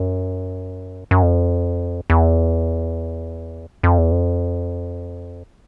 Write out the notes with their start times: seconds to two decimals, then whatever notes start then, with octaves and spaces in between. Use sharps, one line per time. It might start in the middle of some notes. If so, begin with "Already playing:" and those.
Already playing: F#2
1.11 F#2
1.22 F2
2.10 E2
3.83 F2
3.98 E2
4.11 F2